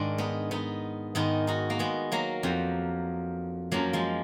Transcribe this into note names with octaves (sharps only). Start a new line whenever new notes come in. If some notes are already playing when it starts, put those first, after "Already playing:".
Already playing: G#2 D#3 D4
B3 D#4
B3 D#4
G#2 D#3 B3 D#4
D#4 F#4
A#3
G#3 B3
F#3 A#3
F2 F3
F#2 F3 F#3 A#3
F3 G#3